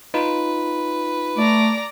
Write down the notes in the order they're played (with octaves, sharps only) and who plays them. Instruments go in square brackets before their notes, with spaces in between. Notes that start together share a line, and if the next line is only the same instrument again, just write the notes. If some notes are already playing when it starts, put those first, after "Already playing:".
[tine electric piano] D#4 F4 [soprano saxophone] B4
[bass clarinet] A3 [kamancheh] D5 A#5